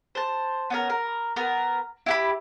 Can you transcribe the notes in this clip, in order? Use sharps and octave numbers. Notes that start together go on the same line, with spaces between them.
C5 A5
B3 C#4 A#4
A#4
B3 A#4
E4 G4 B5